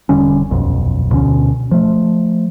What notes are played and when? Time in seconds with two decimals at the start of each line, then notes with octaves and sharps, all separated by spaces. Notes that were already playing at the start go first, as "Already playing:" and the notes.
0.09 E1 D3 G3 C#4
0.50 D#1 B1 F2
1.11 D2 B2 D3 C#4
1.71 F3 A3